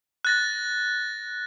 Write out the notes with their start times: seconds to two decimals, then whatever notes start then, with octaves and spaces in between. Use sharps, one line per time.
0.25 F#6 A6 A#6